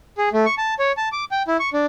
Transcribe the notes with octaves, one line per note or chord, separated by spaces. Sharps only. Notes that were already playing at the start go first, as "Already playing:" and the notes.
G#4
A3
C#6
A5
C#5
A5
D6
G5
E4
C#6
D4